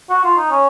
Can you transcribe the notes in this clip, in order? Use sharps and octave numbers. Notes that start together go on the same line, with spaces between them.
F#4
F4
D#4
C#4